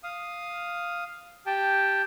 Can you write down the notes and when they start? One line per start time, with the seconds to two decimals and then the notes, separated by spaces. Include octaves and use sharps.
0.04 F5 D#6
1.46 G4 G5 A5